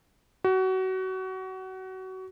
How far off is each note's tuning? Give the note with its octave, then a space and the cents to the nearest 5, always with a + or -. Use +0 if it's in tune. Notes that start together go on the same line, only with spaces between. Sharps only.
F#4 +25